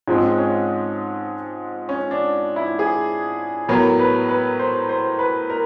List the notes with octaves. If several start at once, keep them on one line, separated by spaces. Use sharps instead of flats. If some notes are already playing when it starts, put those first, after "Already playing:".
G#2 F3 G#3 C4 C#4
C#4
C#4
D4
E4
G#4
A2 F#3 B3 A#4
B4
B4
C5
C5
B4
A#4